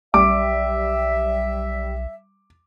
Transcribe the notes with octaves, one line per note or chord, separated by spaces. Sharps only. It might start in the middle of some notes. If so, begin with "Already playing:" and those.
B1 G3 E5 D6